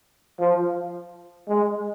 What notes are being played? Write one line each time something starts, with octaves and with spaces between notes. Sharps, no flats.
F3
G#3